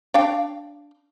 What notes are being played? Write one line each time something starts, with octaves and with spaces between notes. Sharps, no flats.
D4 F5 G5